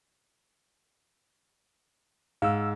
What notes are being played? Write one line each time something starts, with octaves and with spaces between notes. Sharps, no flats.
G#2 F5 E6